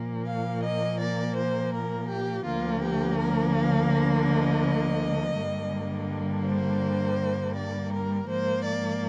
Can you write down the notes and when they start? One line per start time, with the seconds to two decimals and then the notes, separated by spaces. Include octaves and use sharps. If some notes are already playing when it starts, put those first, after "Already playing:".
Already playing: A#2 F3 A#3
0.27 F5
0.63 D#5
0.99 D5
1.36 C5
1.73 A#4
2.09 G4
2.45 D2 D3 F3 A#3 F4
2.82 G4
3.19 A#4
3.55 F5
4.28 D#5
5.36 G2 D3 G3 A#3
6.46 C5
7.56 D5
7.92 A#4
8.28 G#2 F3 A#3 C5
8.64 D5